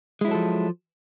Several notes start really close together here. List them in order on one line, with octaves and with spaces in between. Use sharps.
G#3 E4 F#3 A4 F3